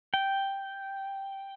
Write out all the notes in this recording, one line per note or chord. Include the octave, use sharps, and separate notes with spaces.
G5